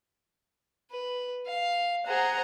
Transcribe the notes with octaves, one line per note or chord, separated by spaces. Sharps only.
B4
F5
G#4 C5 F#5 A#5